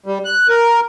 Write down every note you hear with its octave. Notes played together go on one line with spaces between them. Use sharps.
G3
F#6
A#4